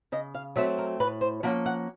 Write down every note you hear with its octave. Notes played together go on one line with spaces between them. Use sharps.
C#3 D#5
F5
F#3 A3 C4 E5
A#4
A2 B4
C5
F3 A#3 C#4 F#5
F#5